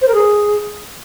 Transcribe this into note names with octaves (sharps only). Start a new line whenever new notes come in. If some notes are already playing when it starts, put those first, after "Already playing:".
C5
A#4
G#4